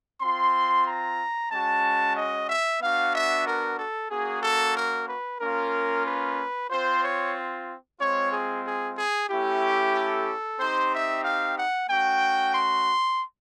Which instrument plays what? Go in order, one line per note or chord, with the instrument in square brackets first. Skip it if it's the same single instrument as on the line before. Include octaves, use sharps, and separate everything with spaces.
[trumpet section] C4 F4 C6
A#5
G#3 C#4 F#4 A5
D#5
E5
B3 D4 F#4 F5
E5
A#4
A4
A#3 C#4 F#4 G#4
A4
A#4
B4
A#3 C#4 F4 A#4
B4
C4 F4 C5
C#5
G#3 C4 F4 C#5
G#4
G#4
G#4
A3 C#4 E4 G4
A4
C4 D#4 G4 C5
E5
F5
F#5
A3 C#4 F#4 G5
C6